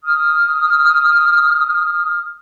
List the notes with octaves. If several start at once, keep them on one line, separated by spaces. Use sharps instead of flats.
D#6 F6